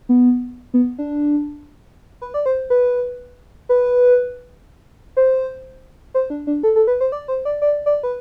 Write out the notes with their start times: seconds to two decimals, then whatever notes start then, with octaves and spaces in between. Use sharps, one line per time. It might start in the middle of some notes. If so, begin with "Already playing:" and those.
0.09 B3
0.74 B3
0.98 D4
2.22 B4
2.34 D5
2.46 C5
2.70 B4
3.69 B4
5.17 C5
6.14 C5
6.30 D4
6.47 D4
6.63 A4
6.76 A4
6.87 B4
7.01 C5
7.12 D5
7.28 C5
7.45 D5
7.62 D5
7.86 D5
8.03 B4